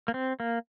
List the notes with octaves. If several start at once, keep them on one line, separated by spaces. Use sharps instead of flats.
A#3
C4
A#3